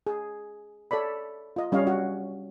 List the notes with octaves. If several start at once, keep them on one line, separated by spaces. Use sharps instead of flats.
G#4
A4 C#5 D5 B5
F4 D#5
G3 C#4 C#5 D#5 F5
F#4